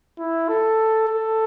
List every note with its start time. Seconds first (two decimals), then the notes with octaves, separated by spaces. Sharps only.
0.19 E4
0.49 A4
1.08 A4